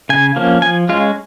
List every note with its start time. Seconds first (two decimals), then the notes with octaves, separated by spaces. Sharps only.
0.09 C#3 G#5
0.36 F3 A#3 C#4
0.62 F3 G#5
0.89 G#3 C#4 F4